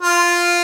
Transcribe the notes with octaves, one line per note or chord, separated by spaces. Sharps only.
F4